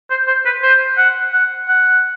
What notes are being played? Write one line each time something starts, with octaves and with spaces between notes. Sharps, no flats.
C5
C5
B4
C5
F#5
F#5
F#5